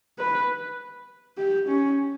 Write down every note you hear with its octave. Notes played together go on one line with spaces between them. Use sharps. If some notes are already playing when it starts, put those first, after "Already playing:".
B4
G4
C#4